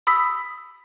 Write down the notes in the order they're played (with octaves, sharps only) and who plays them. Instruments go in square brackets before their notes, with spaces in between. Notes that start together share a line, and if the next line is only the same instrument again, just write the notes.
[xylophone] B5 D#6 E6 B6